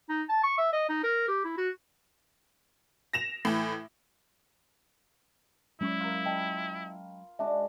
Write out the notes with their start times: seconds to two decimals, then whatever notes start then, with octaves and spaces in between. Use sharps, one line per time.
0.09 D#4
0.29 A5
0.44 C#6
0.58 E5
0.73 D#5
0.89 D#4
1.04 A#4
1.28 G4
1.45 E4
1.58 F#4
3.13 A#6 E7 F7
3.45 A2 E3
5.81 F#3 G#3 C#4 E4 B5 C#6
6.00 F4 A#4
6.25 D#5 G5 A5 B5
7.39 G#3 D4 F#4 E5